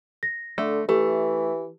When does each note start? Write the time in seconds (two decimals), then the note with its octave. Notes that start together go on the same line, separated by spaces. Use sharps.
0.23 A#6
0.58 D3 A3
0.89 E3 A3 G4